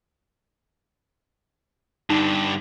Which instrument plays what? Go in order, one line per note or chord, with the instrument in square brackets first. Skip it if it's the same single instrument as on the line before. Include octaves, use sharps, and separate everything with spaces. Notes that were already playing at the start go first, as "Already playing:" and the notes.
[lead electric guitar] G2 D3 [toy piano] D#4 B4